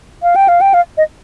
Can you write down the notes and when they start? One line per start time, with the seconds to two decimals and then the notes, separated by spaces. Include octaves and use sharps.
0.23 F5
0.36 G5
0.48 F5
0.61 G5
0.74 F5
0.97 D#5